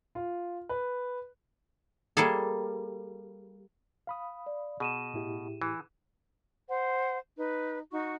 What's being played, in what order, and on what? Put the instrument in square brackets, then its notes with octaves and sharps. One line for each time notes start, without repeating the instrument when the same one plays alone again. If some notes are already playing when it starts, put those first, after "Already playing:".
[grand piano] F4
B4
[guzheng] G3 A#3 G#4 A4
[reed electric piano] F5 B5 D#6
[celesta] D5
[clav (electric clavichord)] B2 [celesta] G#4 D#7 E7
[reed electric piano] A2 E4 G4
[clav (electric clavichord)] E3
[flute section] C5 F#5
D#4 B4
D#4 F#4 C#6